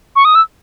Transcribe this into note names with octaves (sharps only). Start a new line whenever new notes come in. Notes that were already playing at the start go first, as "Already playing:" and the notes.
C#6
D#6
E6